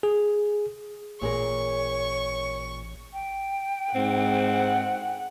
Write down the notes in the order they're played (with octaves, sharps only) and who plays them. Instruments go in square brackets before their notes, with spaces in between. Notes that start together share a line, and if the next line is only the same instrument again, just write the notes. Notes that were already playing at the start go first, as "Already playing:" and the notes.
[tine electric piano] G#4
[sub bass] A1 [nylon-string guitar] A#2 G#4 A#4 [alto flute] C#5 [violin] C#6
[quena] G5
[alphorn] G#2 [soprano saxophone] C4 [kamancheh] F#5